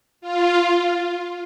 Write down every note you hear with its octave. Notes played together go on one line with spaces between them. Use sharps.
F4